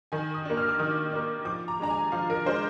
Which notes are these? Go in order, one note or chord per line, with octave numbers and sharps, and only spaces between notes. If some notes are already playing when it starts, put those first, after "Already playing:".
D#3 G#5
D#6
A#3 D4
F6
D6
D#3 D#6
A#3 D4
F3 D6
A#5
G#3 D4 A#5
G#5
F3 F5
A#4
G#3 D4 C5